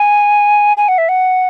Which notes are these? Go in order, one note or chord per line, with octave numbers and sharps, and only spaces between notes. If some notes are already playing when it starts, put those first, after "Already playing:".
Already playing: G#5
G#5
F#5
E5
F#5